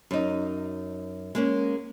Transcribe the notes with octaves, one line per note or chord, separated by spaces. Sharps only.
F#2 D#4
G#3 A#3 C#4